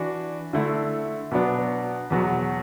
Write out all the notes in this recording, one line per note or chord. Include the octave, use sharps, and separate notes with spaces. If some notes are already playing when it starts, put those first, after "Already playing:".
Already playing: E3 D4 F#4
D3 A3 E4
B2 F#3 B3 D4
E2 B2 F#3